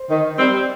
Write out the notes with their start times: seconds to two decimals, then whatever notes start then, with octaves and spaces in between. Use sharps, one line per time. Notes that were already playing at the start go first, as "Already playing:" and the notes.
Already playing: C5
0.10 D#3
0.39 G3 C4